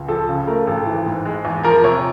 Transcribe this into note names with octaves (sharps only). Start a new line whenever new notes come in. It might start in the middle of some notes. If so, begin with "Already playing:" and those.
Already playing: C#2
F3 A4
C#3
A3 A#4
G#1 A4
E3
G#2
G#3
E2
F3 A#4
C3 C#5